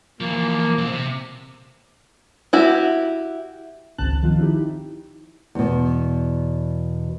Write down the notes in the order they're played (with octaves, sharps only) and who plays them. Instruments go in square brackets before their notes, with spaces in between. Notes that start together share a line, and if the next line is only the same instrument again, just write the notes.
[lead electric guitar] E3 F3 [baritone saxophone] A#3
[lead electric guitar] B1 C4
C3
[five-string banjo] E4 F#4 G4
[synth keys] G#1 C#2 C4 A5 F#6
D#3 F3 C4 F4
D#4 E4 G4
[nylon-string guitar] E2 B2